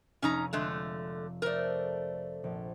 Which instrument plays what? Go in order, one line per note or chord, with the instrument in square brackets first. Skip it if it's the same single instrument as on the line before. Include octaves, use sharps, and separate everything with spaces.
[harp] F1 [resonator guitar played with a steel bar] C#4 D#4 A#5
[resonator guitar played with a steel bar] D3 G#3 A3
[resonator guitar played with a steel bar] A3 A#4 [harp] A4 C5 D5
[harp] A#1